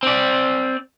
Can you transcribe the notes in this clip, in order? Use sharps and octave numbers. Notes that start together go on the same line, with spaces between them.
C4 D5